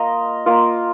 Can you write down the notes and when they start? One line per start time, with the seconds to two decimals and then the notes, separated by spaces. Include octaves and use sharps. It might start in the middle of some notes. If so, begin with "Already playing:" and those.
Already playing: A#3 F4 D#5 A#5
0.46 A#3 F4